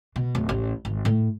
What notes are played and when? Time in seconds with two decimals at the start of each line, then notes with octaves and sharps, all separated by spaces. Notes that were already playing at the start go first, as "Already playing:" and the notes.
0.16 B2
0.35 D1
0.49 A1
0.85 G#1
1.05 A2